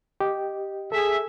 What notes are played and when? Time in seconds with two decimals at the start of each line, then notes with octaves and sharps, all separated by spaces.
0.20 G4 D#5
0.92 G#4 A4 E5